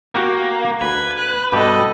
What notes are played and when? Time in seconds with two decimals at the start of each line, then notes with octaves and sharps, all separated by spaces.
0.15 A#3 F#4 G4 A#4
0.81 D2 B4 G#6
1.18 F#6
1.52 G2 B2 G4 A4 D#5